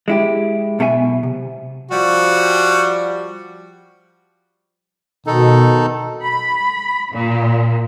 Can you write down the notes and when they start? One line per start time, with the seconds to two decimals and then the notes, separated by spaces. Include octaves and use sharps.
0.08 G#3 E4 G4
0.79 B1 B2 A4 E5 G#5
1.23 C3
1.91 F3 G3 F#4
5.27 B2 D#3 D#4 A4
6.23 B5
7.13 A#2